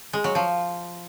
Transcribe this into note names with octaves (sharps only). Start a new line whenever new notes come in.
G#3
F#3
F3